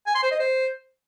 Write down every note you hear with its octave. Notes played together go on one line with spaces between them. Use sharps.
G#5
C6
C5
D#5
C5